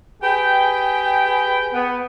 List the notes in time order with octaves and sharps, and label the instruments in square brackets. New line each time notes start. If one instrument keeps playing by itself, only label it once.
[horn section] G4 G#4 B4 G5
B3